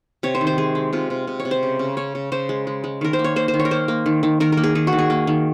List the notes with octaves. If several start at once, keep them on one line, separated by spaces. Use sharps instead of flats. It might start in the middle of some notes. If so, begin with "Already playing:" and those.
C3 C#5
C5
D#3
C5
G#3 G#4
G#3
C3 F4
C3
C3
C#5
C3
C5
C#3
C#3
C#3 C#5
C#3
C#3 C5
G#3
G#3
G#3
D#3 A#4
C5
A#3
C#5
A#3 C5
C5
D#3
C#5
A#4
A#3 C5
A#3
D#3
D#3
D#3 A#4
A#4
A#3
G#4
D#3 G#4
F#4
D#3
G#4
A#3
D#3